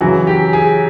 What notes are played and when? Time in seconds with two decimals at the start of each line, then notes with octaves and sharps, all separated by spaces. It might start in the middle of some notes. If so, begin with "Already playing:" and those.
0.01 F#2 C#3 E3 F#4
0.27 G4
0.53 G#4